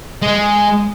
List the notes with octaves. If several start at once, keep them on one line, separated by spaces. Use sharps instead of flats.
G#3